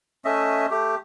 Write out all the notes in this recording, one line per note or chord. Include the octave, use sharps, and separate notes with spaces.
A3 C#4 D#5 E5
A3 G4